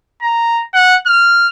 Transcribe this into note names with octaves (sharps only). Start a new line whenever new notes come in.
A#5
F#5
F6